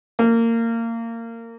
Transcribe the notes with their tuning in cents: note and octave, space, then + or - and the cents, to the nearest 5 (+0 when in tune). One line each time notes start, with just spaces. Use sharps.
A#3 -25